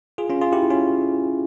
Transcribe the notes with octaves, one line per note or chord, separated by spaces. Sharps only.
F4 G#4
C#4 F4
F4 G#4
E4 G4
C#4 F4